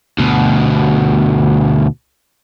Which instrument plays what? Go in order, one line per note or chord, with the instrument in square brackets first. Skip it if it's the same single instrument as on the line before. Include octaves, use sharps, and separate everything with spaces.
[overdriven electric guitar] D2 B2